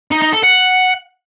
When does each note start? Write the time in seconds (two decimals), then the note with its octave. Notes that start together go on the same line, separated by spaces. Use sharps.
0.11 D#4
0.22 D#4
0.32 A4
0.43 F#5